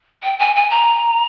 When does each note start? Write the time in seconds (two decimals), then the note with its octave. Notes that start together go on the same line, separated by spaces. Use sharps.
0.23 G5
0.39 G#5
0.56 G#5
0.70 A#5